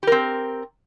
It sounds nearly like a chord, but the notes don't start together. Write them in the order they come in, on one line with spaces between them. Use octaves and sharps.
G4 A#4 C4